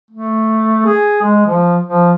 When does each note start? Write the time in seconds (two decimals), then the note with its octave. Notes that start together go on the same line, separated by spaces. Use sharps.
0.11 A3
0.86 G#4
1.22 G#3
1.46 F3
1.85 F3